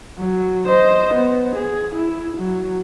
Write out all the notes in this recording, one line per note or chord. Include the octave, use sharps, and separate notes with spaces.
F#3
C5 D#5
B3
G#4
E4
F#3